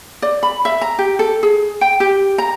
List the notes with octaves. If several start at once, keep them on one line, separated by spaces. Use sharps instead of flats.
D5
B5
E5
A#5
G4
A4
G#4
G5
G4
A#5